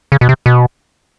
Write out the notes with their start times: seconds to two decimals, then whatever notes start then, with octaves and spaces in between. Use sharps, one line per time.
0.12 C#3
0.21 B2
0.29 C3
0.46 B2